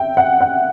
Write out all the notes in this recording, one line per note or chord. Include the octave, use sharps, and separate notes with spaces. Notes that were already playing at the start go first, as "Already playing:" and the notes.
Already playing: E5 G5
F#5
F#5